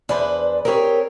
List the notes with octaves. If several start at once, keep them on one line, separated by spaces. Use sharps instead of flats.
E2 D4 B4 C5
C4 G4 G#4 A#4 C#5